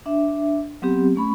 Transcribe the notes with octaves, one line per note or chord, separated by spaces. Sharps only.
D4 E5
F#3 B3 C4 G4
A3 C#4 B5 C#6